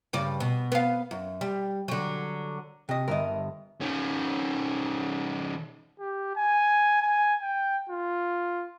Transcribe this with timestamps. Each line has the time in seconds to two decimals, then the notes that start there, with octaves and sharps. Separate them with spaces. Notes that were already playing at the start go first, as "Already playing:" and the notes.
0.13 G2 C#3 D5
0.40 B2
0.72 B3 F5
1.11 F#2
1.41 G3
1.88 D3 F#3
2.89 C3 D#5
3.08 G1 B3 A#4 D#5 E5
3.81 D#3 C#4
6.00 G4
6.36 G#5
7.02 G#5
7.42 G5
7.90 F4